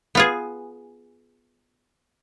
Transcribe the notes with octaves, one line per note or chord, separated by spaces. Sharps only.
B3 F4 G#4